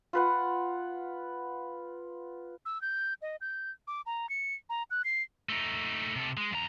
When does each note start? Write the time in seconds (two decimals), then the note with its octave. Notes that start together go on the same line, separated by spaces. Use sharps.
0.13 F4 B4 F#5
2.65 E6
2.82 G6
3.22 D#5
3.41 G6
3.87 D6
4.06 A#5
4.29 C#7
4.69 A#5
4.91 F#6
5.04 C7
5.49 A3 D#4
6.16 C3 A4
6.37 G#3
6.52 E2 A#5